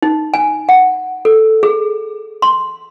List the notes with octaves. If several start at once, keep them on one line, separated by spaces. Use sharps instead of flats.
D#4
G#5
F#5
A4
G#4
C6